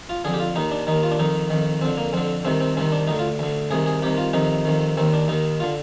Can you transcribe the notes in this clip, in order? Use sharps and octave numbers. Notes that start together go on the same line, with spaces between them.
F4
F2 D3 G#4
G4
F4
D#2 D#3 D#4
D4
D#2 D#3 D#4
F4
D4
F2 D#3 D#4
F2 D#3
F2 D3 C4
A#3
F2 D3 C4
C2 C3 D#3 C4
C4
C2 C3 D#3 C4
D4
D2 D3 D#4
F4
D2 D3
C2 C3 D#3 G#4
G#4
C2 C3 D#3 G4
F4
F2 C3 D#3 D#4
F2 C3 D#3
D#2 D#3 C4
D4
D#2 D#3 D#4
D3 F4